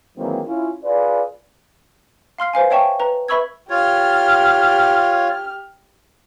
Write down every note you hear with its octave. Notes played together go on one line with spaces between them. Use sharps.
D#3 E3 F#3 G#3 A#3 C4
C#4 E4 F4
F4 G#4 B4 D5
F5 C6 F6 C7
B4 C5 F5 G#5
C#5 E5 G5 A5 C#6
B4 A#5
B4 E5 B5 C#6 E6 G#6
F4 G4 C#5 F6